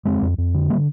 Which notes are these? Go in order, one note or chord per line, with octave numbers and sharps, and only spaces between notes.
F2 G#3 C4
F2
F2
D3
G3 A#3